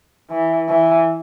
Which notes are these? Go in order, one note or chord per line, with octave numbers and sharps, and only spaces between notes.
E3
E3